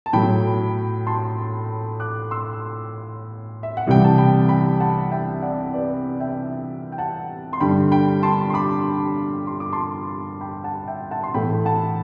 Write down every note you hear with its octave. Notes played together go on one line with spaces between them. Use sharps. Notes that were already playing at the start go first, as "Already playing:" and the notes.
A5
A2 F#3 A3 G5 B5
A5 C6
D6 F#6
C6 E6
E5
F#5
C2 C3 E3 G3 G5
A5
G5 B5
G5 B5
F#5 A5
E5 G5
D5 F#5
B4 D5
E5 G5
G5
F#5 A5
C6
G2 D3 G3 G5 B5
G5 B5
A5 C6
C6
B5 D6
C6
D6
A5 C6
G5 B5
F#5 A5
E5 G5
F#5 A5
C6
A2 E3 A3 G5 B5
F#5 A5